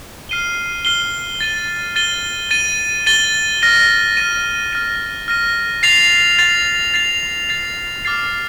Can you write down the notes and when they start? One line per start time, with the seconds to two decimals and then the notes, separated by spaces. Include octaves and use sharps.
0.29 F6 C7 D#7 G7
0.85 F6 C7 D#7 G7
1.41 A6 D#7 G7
1.96 A6 D#7 G7
2.51 A6 D#7 G7
3.06 A6 D#7 G7
3.62 F6 A#6 D#7
4.17 F6 A#6 D#7
4.73 F6 A#6 D#7
5.28 F6 A#6 D#7
5.83 A6 C7 F7
6.38 A6 C7 F7
6.94 A6 C7 F7
7.49 A6 C7 F7
8.05 D6 F6 A6 C7